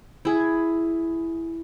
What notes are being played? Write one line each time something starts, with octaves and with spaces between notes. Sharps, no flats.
E4 G#4